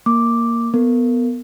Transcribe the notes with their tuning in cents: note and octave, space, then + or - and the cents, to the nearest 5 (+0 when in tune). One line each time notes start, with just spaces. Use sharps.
A#3 +0 D6 +0
B3 +0 A#4 -35